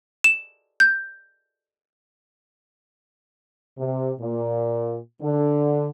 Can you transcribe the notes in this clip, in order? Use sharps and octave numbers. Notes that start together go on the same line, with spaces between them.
E7
G6
C3
A#2
D3